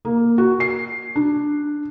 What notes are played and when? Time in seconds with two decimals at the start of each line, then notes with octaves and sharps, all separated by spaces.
0.05 A#3
0.38 F#4
0.60 C7
1.16 D4